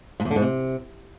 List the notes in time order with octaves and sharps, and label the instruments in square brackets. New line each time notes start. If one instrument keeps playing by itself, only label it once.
[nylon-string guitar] G#2
E2
D3
G#2
C3